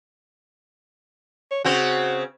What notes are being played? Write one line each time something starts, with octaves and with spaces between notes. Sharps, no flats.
C#5
C#3 C4 F#4 C5